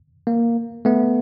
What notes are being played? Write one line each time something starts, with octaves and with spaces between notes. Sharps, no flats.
A#3
A3 B3